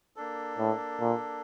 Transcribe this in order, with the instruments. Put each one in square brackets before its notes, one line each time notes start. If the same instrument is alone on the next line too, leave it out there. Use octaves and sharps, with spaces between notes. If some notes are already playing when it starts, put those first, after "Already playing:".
[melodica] A#3 D4 A4
[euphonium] A2
A#2